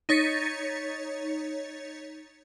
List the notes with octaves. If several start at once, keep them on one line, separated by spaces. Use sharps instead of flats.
D#4 C#5 A6 B6 C#7